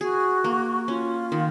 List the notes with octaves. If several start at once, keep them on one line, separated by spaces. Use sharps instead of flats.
F#4 G#4
A#3
C#4 F4
D#3